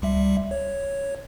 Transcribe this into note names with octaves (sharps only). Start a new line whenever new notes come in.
C#2 G3 E5
C#5